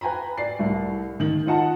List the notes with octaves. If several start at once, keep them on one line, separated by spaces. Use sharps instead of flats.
B4 G5 G#5 A#5 B5
D5 C7
C2 A2
D#3 F#7
D#4 F4 D#5 F#5 A5